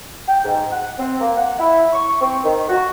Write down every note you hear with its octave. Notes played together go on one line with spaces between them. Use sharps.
G5
G#2
F#5
C4
A#3
F#5
E4
C#6
C4
D#3
F#4